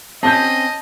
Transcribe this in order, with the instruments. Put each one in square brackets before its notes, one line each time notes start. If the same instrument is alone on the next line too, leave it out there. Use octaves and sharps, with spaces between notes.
[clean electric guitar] C4 C#4 [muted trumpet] D#5 [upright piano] A5 G6